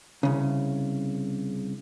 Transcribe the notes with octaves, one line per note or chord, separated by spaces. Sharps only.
C2 C#3